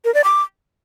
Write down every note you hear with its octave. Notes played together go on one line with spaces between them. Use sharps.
A#4
D5
D6